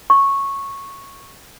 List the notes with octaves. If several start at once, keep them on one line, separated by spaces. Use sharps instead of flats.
C#6